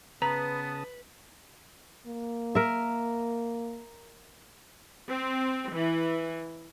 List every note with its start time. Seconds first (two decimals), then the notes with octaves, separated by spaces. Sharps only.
0.22 C#3 B3 B4 A5 A#5 D#6
2.07 A#3
2.55 A#4 E5
5.09 C4
5.72 E3